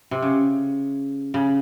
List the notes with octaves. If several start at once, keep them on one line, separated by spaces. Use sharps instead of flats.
C3
C#3
C#3